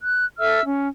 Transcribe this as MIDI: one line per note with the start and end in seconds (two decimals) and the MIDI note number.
0.01 0.25 90
0.39 0.61 69
0.39 0.61 76
0.39 0.61 88
0.39 0.61 89
0.63 0.87 61